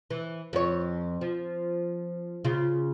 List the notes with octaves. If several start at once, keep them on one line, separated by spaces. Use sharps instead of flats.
E3
F2 C#5
F3
C#3 F4